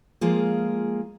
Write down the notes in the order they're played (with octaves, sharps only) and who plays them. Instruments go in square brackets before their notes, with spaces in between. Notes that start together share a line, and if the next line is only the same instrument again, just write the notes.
[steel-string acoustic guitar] F3 G#3 A#3 F4 G#4